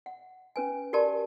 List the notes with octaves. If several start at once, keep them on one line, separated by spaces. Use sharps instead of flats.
F#5
C#4 B4 G#5
F#4 G4 A#4 D5 A5